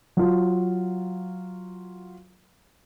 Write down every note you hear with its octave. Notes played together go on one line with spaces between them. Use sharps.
F#3 F4